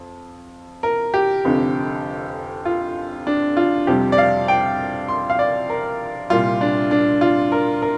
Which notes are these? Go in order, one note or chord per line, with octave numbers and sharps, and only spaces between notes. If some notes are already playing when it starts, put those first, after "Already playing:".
Already playing: F2
A#4
G4
F1 F2 D3
F4
D4
F4
F2 C3 G3 G4
D5
F5
G5
C6
F5
D5
A#4
C2 A#2 G3 F4
D4
D4
F4
A#4
A#4